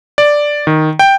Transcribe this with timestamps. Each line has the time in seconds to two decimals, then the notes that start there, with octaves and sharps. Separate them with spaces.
0.18 D5
0.67 D#3
0.99 G5